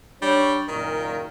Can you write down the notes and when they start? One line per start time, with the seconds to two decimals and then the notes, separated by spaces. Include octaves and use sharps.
0.22 G3 D4 C#5
0.68 F#1 A#2 D#3 A#4